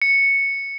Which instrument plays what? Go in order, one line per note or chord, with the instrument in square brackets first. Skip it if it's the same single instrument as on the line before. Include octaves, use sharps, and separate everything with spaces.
[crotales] C#7